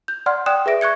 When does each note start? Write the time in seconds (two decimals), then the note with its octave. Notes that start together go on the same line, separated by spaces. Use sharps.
0.08 G6
0.26 D5 F#5 C6 F6
0.46 D5 G5 D#6 F#6 E7
0.66 G#4 B4 E5 A#6 D7
0.81 C#6 F#6 G#6 C#7